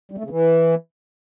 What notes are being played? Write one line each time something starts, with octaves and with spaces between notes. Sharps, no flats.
G3
A3
C#3
E3